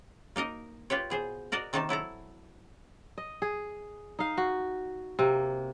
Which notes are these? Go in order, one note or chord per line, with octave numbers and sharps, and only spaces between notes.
A#3 D#4 A#4 D#5
F4 G4 B4 C#5
B2 G#4 C5
F#4 A#4 D5 D#5
C3 D#3 A#3 D#4 A5
F#3 E4 A4 A#5
D#5
G#4
D#4 F5
F#4
C3 A#3